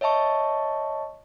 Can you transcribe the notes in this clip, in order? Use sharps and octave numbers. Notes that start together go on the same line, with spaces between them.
C#5 D#5 E5 A5 C#6